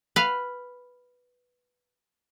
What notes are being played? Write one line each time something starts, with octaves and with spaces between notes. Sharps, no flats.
B4 F5